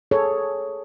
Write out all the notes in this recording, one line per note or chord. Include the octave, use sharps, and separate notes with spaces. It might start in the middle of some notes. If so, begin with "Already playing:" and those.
G#4 A4 C#5